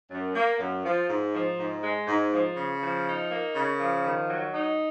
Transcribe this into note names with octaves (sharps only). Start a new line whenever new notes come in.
F#2
A#3
F#2
F3
G#2
F3
G#2
G#3
G#2
F3
C#3
F3
D#4
A#3
C#3
F3
D#3
F#3
D#4